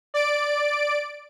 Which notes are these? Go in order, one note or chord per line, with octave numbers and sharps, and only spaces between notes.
D5 D7